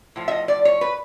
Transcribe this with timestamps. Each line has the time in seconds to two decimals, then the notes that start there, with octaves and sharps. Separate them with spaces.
0.16 A2 F3
0.28 E5
0.31 D#5
0.48 D5
0.65 C#5
0.81 B4